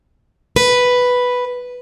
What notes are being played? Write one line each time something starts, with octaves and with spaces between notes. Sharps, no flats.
B4